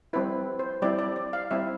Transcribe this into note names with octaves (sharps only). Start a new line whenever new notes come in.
G3 C4 E4 B4
C5
G3 C4 E4 D5
D5
D5
F5
G3 C4 E4 E5